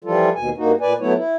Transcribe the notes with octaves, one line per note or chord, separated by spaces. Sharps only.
E3 F3 G3 F4 A4
D#2 B2 G#5
G2 A#3 D#4 F#4
A#2 B4 D5 G#5
F#3 A3 B3 E4 C#5
E4